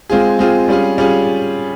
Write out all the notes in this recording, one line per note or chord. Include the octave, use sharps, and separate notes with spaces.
G#3 C4 F4 G#4
G#3 C4 F4 G#4
G3 C#4 F4 G#4
G3 C#4 F4 G#4